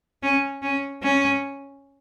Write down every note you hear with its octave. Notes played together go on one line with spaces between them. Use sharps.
C#4
C#4
C#4